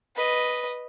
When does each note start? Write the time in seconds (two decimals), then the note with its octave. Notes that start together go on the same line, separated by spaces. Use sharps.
0.16 B4 D#5